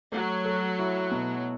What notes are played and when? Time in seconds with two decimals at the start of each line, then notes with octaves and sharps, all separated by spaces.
0.12 F#3 A3
0.45 A4
0.79 E4
1.11 B2